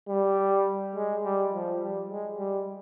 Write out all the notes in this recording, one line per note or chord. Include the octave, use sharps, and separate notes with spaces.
G3
G#3
G3
F3
G3
G#3
G3